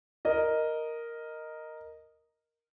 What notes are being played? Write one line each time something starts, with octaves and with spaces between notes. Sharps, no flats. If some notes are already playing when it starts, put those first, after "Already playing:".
A#4 D#5